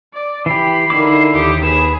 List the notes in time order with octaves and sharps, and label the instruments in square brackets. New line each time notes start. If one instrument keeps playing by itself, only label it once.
[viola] D5
[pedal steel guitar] E3 G4 [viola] B5 [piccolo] C7
[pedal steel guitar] D3 E4 D6 [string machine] D#4 A#4
[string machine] D#2 [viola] D#4 G4
[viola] G#4 [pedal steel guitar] B4 [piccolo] E7